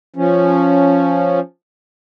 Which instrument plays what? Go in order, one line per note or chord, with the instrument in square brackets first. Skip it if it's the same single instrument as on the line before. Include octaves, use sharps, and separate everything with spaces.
[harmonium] F3 C#4